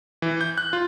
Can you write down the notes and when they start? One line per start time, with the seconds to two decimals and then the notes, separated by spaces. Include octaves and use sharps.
0.22 E3
0.41 G6
0.58 F#6
0.73 F4